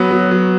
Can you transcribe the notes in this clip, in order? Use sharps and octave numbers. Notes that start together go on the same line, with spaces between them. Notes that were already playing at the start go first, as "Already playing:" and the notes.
Already playing: F#3 B3
F#3
F#3